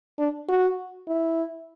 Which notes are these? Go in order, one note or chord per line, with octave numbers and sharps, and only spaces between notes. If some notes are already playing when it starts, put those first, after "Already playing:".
D4
F#4
E4